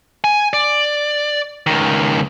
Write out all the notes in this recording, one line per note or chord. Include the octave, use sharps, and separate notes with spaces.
G#5
D5
C#2 D#3